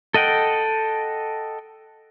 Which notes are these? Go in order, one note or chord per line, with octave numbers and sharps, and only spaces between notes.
A4 D#5 F#5 G5